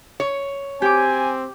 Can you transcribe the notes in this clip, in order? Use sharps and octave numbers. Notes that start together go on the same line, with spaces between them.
C#5
C4 G4 G#5 D6